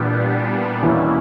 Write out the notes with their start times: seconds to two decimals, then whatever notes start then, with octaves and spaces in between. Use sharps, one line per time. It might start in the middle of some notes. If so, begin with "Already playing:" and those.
Already playing: A#2 E3 G3 B3 D4
0.83 E2 B2 E3 A#3 C#4 E4